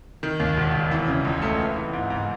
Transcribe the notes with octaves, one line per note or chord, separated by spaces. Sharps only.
D#3
D#2
E1
E1
E3
C#3
C#2
A3
B3
E3
G#2
G#2